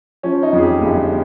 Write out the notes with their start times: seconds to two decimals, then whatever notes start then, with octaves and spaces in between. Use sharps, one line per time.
0.23 F3 C#4
0.43 D#4
0.53 F2
0.58 G#4
0.62 G4
0.81 G1 G#4